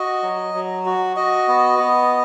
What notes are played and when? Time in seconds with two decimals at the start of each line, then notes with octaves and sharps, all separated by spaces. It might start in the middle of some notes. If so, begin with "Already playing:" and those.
Already playing: F#4 D#5
0.23 F#3
0.54 F#3
0.86 F#4
1.16 F#4 D#5
1.48 B3
1.79 B3